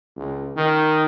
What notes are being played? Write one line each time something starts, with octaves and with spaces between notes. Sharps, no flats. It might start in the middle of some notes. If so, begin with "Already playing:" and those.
C#2
D#3